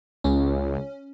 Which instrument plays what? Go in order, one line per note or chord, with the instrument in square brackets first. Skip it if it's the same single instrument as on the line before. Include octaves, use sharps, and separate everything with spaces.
[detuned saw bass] C#2 [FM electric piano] C#4